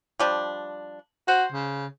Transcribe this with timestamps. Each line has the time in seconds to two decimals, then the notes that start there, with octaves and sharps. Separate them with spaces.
0.19 F3 G3 D4
1.28 F#4 C5
1.52 C#3